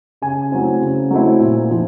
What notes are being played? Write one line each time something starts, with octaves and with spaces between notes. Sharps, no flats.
C#3 G#5
F#3 A3 C4 E4
C#3
F#3 A3 C4 E4
A#2
F3